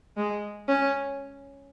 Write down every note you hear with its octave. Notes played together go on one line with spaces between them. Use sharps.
G#3
C#4